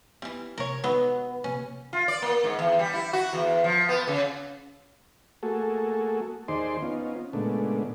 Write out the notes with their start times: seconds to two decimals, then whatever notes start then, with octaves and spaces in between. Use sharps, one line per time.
0.22 E3 G3 B3
0.58 C3 A#3 A#4 C#5
0.84 F#3 B3 D#4
1.44 C3 A#3 C#4
1.93 F4
2.08 D5
2.22 A#3
2.44 G#2
2.59 E2
2.79 G3
2.93 E4
3.13 F#4
3.33 E2
3.64 F3
3.89 B3
4.08 C#3
5.43 A3 A#3 F#4 G#4 A4
6.48 D#2 D#4 G#4 C5 D5 C6
6.82 B3 C#4 D#4 F4
7.33 A#2 C#3 G#3 A3 B3 D4